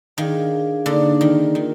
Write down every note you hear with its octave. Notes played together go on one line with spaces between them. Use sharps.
D#3 D4 G#4 D5 F5
D3 A#3 D#4 G#4
D#3
D#3 A#3 F4 A#4